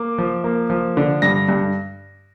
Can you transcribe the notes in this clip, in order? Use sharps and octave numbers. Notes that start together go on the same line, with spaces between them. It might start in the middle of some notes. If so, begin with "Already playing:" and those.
Already playing: A#3 D6
F3
A#3
F3
D3
G2 A#6
G2